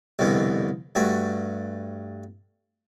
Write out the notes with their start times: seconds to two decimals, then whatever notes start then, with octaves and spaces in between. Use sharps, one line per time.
0.19 C2 F2 B2 D3
0.95 G2 A3 F#4